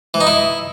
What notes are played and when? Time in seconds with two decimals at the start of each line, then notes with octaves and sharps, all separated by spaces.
0.14 E3
0.21 D#4
0.27 E4